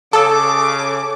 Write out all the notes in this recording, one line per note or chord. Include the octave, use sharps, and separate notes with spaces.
C#3 A4 A5 D6 E6